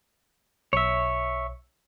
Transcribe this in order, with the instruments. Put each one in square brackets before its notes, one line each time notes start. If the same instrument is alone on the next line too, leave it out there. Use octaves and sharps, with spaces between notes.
[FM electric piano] B1 [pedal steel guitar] C#5 E5